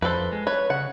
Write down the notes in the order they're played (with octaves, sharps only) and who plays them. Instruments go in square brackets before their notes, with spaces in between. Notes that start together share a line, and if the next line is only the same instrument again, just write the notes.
[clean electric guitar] F2 F#4 C5 [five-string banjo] A4 B4
[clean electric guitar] G#3
[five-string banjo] B4 [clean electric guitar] C#5
[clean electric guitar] C#3 [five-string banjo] F#5